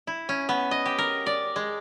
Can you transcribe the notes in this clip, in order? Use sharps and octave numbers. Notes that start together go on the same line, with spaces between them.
E4
C#4
B3
D#5
G4
A#4
D5
G#3